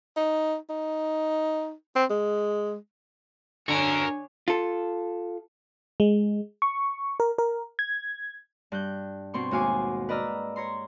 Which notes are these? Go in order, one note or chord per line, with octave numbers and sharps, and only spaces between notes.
D#4
D#4
C4
G#3
D3 F#4 A#4 C#5 G#5
F4 A4
G#3
C#6
A#4
A#4
G#6
G2 F#6 G6
B2 C4 C6 C#6
D#2 G#2 F#4 F5 G#5 D6
B4 D5 D#5 A#5 E6 F6
C#5 A#5 C6